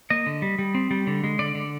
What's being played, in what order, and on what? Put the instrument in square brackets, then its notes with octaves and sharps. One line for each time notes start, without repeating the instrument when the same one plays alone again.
[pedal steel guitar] A#3 D#5
D3
G3
G3
C4
G3
D3
G#3
D3 D5
D3